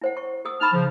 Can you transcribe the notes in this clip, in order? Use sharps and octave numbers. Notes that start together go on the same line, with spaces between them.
E4 C5 F#5
C#6
G#4 D#6 E6
D#4 A5 B5 C#6 F6
C#3 F3